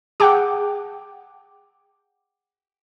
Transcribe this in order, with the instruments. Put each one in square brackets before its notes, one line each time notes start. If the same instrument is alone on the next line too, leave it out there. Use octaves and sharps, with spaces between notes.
[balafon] G#4 A5 [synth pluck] F#5 G5 D6